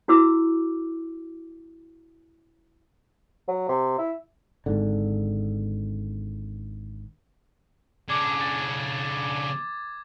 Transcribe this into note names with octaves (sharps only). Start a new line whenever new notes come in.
E4 F#4 D6 E6
F#3
C3
E4
G#1 G#2 D3
C#3 D4 D6 G#6
A6